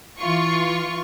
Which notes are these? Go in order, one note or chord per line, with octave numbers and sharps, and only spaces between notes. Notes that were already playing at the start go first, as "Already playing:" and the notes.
E3 F4 C#6